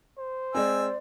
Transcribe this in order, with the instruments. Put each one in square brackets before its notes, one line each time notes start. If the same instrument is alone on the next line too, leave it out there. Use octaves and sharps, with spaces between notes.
[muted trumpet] C5
[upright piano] G#3 C4 [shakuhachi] D5 [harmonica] G#5 E6